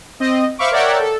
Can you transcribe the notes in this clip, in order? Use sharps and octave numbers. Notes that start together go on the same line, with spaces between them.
C4 D#5
C5 E5 F5 B5 C#6 D6
A#4 C#5 D5 E5 F#5 G5
A4